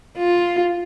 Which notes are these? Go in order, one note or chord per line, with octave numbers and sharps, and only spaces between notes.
F4